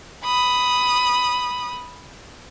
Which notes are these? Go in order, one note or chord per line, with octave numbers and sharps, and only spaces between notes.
B5 D#6